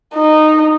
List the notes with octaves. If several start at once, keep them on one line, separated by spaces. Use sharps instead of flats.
D#4